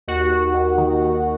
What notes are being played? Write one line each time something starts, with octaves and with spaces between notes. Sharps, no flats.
D#2 F#4
D#2
D#2
D#3
D#3